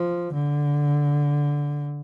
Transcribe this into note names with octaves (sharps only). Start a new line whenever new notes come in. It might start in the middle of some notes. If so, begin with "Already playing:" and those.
Already playing: F3
D3